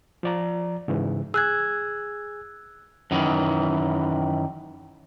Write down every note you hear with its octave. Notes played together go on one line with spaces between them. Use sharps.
F3 D5 A#5
G#2 C#3 E3
G#4 G#5 E6 F#6 G#6
F#2 D#3 E3